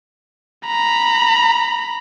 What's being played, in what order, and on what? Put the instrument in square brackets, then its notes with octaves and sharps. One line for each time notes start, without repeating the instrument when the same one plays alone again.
[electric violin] A#5 B5